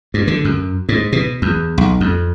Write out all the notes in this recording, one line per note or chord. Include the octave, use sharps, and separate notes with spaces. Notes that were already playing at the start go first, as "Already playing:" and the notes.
G2
D3
F#2
G#2
B2
E2
B1
F2